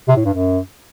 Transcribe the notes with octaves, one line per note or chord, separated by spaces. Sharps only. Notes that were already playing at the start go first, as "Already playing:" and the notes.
C3
A2
G2
F#2